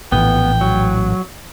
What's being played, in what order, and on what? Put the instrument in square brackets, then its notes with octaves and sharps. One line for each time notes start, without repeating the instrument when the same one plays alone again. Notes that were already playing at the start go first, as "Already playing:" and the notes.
[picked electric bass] A#1 A2 E3 [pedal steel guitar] B3 [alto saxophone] G5
[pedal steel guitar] F#3